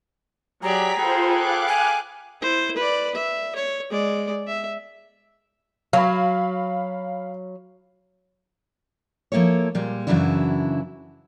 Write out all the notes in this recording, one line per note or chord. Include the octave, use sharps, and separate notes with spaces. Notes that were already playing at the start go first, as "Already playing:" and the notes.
F#3 G4 G#4 D5 A#5 B6
F4 G#4 A4 B4 C5 G5
F5 D6 F#6
G#5
E4 C5
B4 D5
E5
C#5
G#3 D5
E5
F#3 F5 B5
F3 A#3 E4 A4 C#5
A#2 G3 G#3
F#2 C#3 E3 F#3 D4 E4